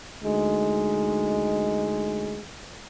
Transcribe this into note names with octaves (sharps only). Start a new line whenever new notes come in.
D2 G#3 D#4